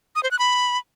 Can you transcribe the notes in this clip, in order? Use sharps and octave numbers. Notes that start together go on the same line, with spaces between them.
D#6
C5
F#6
B5